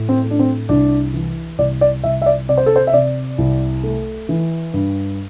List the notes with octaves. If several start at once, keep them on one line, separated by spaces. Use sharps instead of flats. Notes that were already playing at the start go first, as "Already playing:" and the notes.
Already playing: A2
C4
A3
D4
C4
C2 D4
E3
C2 D5
D5
C2 E5
E5
D5
C3 D5
C5
A4
C5
E5
C3 D5
C2
A3
E3
G2